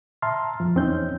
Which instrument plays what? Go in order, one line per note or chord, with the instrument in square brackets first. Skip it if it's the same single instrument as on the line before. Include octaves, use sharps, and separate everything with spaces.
[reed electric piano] E5 A5 A#5 C6 F6
F2 F3
E2 C4 C#4 D#4 G6